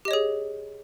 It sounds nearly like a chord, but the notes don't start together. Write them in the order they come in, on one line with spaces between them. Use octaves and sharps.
G4 D#5 C#5 G#4